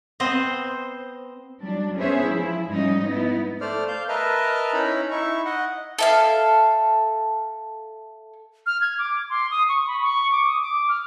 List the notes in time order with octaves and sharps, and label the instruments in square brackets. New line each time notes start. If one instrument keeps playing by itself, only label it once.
[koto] B3 C4 C5 D#5
[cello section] F#3 G3 D4
B3 C#4 G#4 B4 C5 E5
F3 E4
G#2 F3 G3 C#4 D#4 D#5
B3 D#4 E4
[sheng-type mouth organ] A3 C5 D5 F6
F5 G6
A#4 B4 D#5 E5 A5 F6
C#4 D#4 E4 A#5 B5
D#4 E4 E5 C#6
D#5 F#5
[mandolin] A4 E5 F5
[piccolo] F6
G#6
D6
C6
D#6
C#6
B5
C#6
D6
D#6
D6
F6